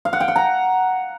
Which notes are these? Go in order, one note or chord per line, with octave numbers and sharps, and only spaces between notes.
F5
F#5
G5
F#5
A#5